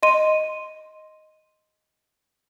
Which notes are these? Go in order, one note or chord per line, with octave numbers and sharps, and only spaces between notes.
D#5 C6 D#7